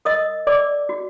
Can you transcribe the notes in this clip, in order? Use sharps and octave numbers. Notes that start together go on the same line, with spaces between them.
A#4 D#5 D#6
A#4 D5 D6
F#4